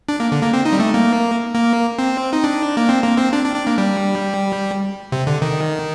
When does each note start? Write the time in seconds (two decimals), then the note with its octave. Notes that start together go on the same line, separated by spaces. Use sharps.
0.09 D4
0.20 A#3
0.32 D3
0.42 A#3
0.53 C4
0.65 D#4
0.73 G3
0.80 A3
0.94 A#3
1.54 A#3
1.99 C4
2.33 D#4
2.44 D4
2.77 A#3
2.89 C4
3.03 A#3
3.18 C4
3.33 D4
3.45 D4
3.56 D4
3.67 A#3
3.78 G3
5.12 C3
5.27 D3
5.42 D#3